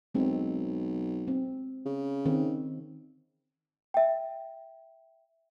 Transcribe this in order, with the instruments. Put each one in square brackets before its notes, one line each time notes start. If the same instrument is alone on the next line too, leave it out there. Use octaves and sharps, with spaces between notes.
[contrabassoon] B1 [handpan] G#3 C4
[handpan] C4
[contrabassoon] C#3
[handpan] D#3 C4
[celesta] E5 G5